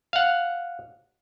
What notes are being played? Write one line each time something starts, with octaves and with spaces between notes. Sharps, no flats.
F5 F#5